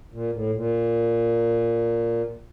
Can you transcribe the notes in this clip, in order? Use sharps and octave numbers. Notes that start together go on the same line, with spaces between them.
A#2
A2
A#2